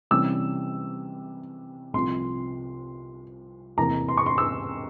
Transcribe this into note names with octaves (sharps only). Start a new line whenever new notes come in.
C3 E3 G3 C#4 E6
C2 C3 F3 C6
E2 C3 E3 A#3 A#5
C6
C#6
C6
E6